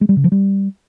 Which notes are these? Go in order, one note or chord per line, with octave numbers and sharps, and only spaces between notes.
G#3
G3
C#3
F3
G3